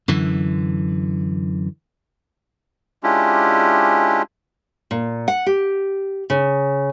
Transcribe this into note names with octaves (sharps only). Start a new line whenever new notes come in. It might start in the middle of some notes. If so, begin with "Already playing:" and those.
F#2 D3 E3
G#3 C#4 D4 E4 F4 G4
A#2
F#5
G4
C#3